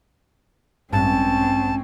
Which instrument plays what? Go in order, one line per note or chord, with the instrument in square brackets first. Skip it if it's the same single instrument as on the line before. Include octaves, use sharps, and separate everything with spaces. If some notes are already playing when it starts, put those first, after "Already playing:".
[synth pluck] A1 G2 [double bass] G#3 C#4 [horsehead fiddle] C4 [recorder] A5